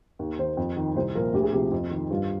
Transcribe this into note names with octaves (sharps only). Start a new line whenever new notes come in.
D#2
D#3 C5
F2
D#3
C2 C5
A#2 F3 A#4
D2 G4
G#4
C3 F3 G4
F2
D#3
G2 F4